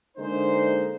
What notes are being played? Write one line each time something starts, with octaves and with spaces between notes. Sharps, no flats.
D3 G#3 A#3 D#4 C5